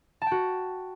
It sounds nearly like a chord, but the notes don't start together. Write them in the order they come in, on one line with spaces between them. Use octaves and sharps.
A5 G5 F#4